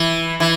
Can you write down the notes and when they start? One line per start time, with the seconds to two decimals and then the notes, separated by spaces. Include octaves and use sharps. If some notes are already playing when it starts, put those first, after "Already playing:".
Already playing: E3
0.40 E3